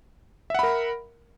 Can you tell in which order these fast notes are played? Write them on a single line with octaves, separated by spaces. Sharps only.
E5 F#5 B5 A#4